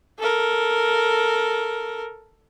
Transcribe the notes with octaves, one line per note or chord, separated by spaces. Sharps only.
A4 A#4